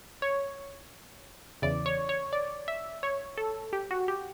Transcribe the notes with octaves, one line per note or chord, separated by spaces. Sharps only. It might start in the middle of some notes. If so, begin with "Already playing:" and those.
C#5
E2 C#3 E3 D5
C#5
C#5
D5
E5
C#5
A4
G4
F#4
G4